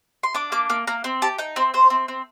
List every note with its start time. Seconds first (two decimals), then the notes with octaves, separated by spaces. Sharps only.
0.23 C6
0.35 D4 D6
0.52 A#3 D6
0.70 A#3 D6
0.87 A#3 A#5
1.04 C4
1.22 G4 A5
1.38 D#4 G5
1.56 C4 C5
1.74 C4 C5
1.90 C4
2.08 C4